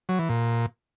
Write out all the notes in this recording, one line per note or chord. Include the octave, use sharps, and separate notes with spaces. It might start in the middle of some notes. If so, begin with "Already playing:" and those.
F#3
E3
A#2